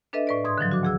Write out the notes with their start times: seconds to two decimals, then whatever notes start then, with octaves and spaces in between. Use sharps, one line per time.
0.13 D4 A4 B4 D#5 E5
0.27 A2 B4 D5
0.44 G#2 C6 D#6 G#6
0.58 D3 D#3 F3 F#3
0.71 F#4 D6
0.83 D2 G#4 E6